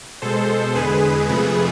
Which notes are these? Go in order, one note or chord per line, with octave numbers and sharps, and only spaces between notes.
B2 G#3 A4 C5
E2 D3 G#3 G#4 B4
F2 C3 F3 A3 G#4 B4